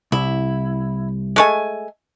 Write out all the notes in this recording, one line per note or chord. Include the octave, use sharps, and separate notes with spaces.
C2 E4
G#3 A3 G#5